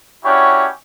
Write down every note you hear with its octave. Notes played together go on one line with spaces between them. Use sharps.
C#4 D4 E4 F#4 G4 C#5